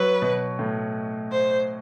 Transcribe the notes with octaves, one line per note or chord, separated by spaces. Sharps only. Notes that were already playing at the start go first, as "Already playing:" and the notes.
Already playing: F#3 B4
B2
A2
C5